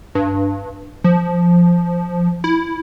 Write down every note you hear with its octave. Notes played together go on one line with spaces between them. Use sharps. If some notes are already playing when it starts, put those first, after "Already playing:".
G2
F3
E4